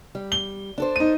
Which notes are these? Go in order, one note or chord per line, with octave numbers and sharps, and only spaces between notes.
G3
G7
D4 A4 C5
D#4 D#7